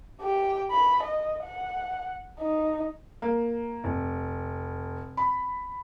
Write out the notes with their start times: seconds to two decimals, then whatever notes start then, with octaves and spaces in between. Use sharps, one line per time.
0.20 G4 G5
0.71 B5
1.03 D#5
1.43 F#5
2.40 D#4
3.22 A#3
3.84 F1
5.17 B5